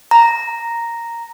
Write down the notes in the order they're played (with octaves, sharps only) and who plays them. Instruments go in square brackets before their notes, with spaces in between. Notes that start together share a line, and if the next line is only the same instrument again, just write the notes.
[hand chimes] A#5